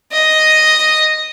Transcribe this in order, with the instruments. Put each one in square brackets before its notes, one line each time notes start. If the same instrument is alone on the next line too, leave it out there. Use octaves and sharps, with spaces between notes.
[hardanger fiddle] D#5